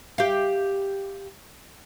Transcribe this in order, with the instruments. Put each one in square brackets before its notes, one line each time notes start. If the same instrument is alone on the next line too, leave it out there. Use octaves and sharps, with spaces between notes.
[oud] G4 F5